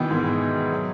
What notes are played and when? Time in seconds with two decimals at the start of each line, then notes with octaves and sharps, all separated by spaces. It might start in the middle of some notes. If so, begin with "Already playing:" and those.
Already playing: B2 D#3 E3 B3 D#4 E4
0.11 G#2 G#3
0.72 F#3